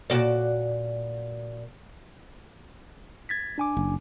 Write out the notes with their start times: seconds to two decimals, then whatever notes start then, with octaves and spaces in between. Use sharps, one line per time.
0.10 A#2 F#4 D5
3.29 G#6 A6 B6
3.58 D4 G#5 D6
3.77 F#1